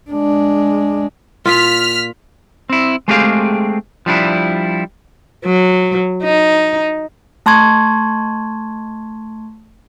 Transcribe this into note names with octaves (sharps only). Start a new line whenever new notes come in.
G#3 D4
A#2 F4 F6 B6
C4 E4
G#3 A3 C4 G4 G#4 F5
F3 G3 D4 E4
F#3
D#4
A3 A5 C6 C#6 G#6